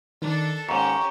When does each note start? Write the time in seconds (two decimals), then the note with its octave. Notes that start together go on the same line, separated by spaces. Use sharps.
0.22 D#3 D4 A4
0.69 D#2 G#2 C#4 G4 A#5 C#6